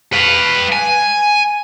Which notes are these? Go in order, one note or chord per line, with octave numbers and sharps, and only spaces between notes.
B4 F5
G#5